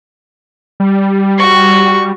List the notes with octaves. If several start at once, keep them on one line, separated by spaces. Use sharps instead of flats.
G3
F#4 C#6